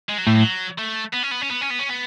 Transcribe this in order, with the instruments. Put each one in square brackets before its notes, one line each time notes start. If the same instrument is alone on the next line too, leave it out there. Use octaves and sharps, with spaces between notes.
[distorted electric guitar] G#3
F#3
[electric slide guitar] A2 [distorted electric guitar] A3
[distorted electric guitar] F#3
A3
B3
C#4
B3
C#4
B3
C#4
B3
C#4
B3